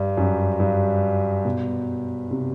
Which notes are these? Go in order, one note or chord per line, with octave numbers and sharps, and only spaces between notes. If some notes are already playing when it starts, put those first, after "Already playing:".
Already playing: G2
F#2
G2
B2
C3